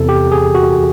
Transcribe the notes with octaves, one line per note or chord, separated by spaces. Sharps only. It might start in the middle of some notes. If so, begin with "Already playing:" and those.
Already playing: E2 C3 E3 A4
G4
G#4
F#4